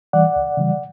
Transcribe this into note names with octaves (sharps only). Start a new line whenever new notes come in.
E3 G3 D5 F#5
C#2
C#3 E3 G3